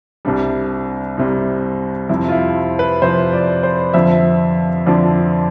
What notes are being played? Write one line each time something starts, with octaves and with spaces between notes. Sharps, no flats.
C2 C3 G3 D4
C2 C3 G3
F2 C3 F3 E4
F4
E4
B4
F2 C3 F3 C5
D5
C5
F2 D3 F3 E5
F2 D3 F3 D5